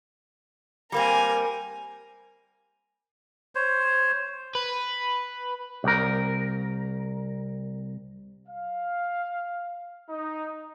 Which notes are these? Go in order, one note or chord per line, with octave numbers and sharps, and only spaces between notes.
G3 A#3 C4 A#4 G#5
C5 C#5
B4
C2 A#4
F5
D#4